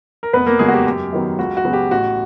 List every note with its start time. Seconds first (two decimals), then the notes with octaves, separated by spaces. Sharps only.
0.23 A#4
0.33 F1 B3 B4
0.46 A#3 A#4
0.59 E2 C#3 F#3 G#3 G#4
0.68 F#4
0.73 G4
0.86 F#2
1.13 D#3 F#3 B3
1.39 C#2 F#4
1.57 F#4
1.65 C#3 F#3 B3
1.73 G4
1.91 A1 F#4